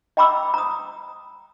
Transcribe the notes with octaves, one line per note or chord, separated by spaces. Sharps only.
D#5 G5 A#5 B5 D6 E6
A#5 D#6